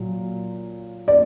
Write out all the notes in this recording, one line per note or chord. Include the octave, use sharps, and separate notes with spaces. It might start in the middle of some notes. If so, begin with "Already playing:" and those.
Already playing: A#2 F#3
D5